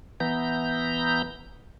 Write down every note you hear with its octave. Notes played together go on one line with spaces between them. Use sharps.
E3 B3 A#5 G6